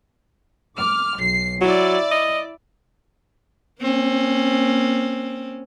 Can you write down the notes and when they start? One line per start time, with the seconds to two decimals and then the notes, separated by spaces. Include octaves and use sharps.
0.77 D6 F6
1.19 B1 C7
1.61 F#3 E4 D5
2.11 D#5
3.81 A#3 C4 C#4